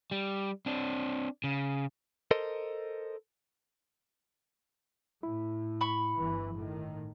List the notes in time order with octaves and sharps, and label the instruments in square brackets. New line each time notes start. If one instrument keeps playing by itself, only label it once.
[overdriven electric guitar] G3
C4 D4
C#3
[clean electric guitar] A4 A#4 C5 D#5
[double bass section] A2 [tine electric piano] E4
[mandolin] B5 C#6
[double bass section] G1 E3
A2 D#3